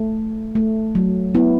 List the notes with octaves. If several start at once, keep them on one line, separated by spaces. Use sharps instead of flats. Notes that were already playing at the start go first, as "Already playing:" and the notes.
Already playing: A3
A3
F#3
B3 E4